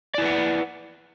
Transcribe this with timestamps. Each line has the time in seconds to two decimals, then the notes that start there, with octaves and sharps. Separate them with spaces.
0.14 D5
0.18 E4
0.22 B4
0.25 F#5